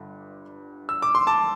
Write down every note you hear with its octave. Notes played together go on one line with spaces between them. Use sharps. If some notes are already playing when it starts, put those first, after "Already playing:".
Already playing: G1 G2 D3
E6
D6
C6
A5 D6